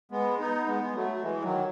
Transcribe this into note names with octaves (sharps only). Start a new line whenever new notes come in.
G#3 B3
B3 D#4
G#3 B3
G#3
F#3 A3
F#3
E3 G#3
D#3 F#3